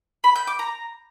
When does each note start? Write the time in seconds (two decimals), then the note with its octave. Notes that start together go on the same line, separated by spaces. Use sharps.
0.24 B5
0.36 G6
0.47 D6
0.59 A#5